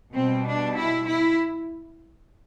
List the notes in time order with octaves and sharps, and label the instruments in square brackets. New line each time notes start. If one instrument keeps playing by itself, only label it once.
[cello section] B2 G3 C4
D4
E4
E4